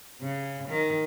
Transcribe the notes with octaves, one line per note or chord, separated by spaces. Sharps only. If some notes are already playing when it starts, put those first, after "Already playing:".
C#3
D#3